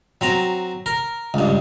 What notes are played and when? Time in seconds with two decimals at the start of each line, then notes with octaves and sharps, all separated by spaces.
0.21 F#3 C4 A#5
0.86 A#4
1.34 C#2 G2